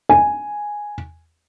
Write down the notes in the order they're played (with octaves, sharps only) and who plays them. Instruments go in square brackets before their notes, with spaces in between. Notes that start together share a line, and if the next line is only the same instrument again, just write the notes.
[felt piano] G#5